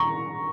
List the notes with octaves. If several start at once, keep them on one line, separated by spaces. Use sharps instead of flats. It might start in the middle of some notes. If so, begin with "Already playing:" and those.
Already playing: A#5 C#6